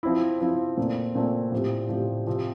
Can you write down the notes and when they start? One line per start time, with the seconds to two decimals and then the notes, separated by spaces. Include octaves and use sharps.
0.03 F3 C4 E4
0.41 F3 C4 E4
0.77 A#2 A3 C4
1.15 A#2 A3 C4
1.52 A2 F3 C4 G4
1.89 A2 F3 C4 G4
2.27 C3 F3 C4 G4